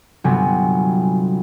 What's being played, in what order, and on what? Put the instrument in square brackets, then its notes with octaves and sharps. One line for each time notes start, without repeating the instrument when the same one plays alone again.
[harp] G1 C3 F#3 B3 C4 G#5